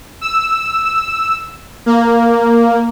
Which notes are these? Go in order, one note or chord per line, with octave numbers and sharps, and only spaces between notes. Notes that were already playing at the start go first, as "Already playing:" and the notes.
E6
A#3